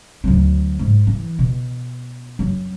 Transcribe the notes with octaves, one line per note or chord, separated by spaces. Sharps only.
D2 F#3
G#2
E3
B2
F#2